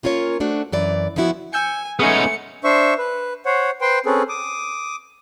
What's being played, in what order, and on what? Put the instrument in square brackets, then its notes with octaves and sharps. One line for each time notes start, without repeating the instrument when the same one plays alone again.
[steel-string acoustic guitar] A#3 C#4 F4 A#4 C#5
A3 D4 F#4 C5
F#2 E3 D5
F3 G#3 B3 E4 F#4
[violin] G#5 [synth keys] E6 G6 C#7
[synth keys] G#3 C#4 G#4 [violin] A3 C#7 [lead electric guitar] B3 D#4
[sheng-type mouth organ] D4 C5 E5 C#6
B4
C5 C#5 F#5
B4 C5 G5 C6
C4 C#4 G#4 A4 B4
D6 D#6